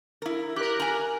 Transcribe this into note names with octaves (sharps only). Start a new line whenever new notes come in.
E4 A#4
G4 A#4 F#6
G#5 A#5